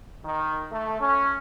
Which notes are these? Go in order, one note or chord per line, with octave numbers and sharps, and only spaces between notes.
D#3
A3
C#4